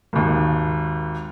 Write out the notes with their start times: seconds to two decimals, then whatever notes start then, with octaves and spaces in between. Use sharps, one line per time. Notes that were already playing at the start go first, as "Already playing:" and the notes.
0.13 G#1 D#2